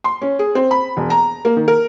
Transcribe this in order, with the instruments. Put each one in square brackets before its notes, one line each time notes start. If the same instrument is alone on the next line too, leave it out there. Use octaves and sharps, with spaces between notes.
[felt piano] C6
C#4
G#4
C4
B5
E1
A#5
A#3
D#3
A#4